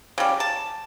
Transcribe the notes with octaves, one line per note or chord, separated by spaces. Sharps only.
C#3 G3
A5